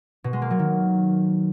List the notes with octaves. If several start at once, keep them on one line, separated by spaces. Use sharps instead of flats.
B2
G#3
A#3
F#3
D#3